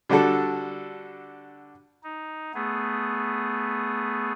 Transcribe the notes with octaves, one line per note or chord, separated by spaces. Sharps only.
D3 G3 D4 F#4 A4
D#4
A3 B3 G#4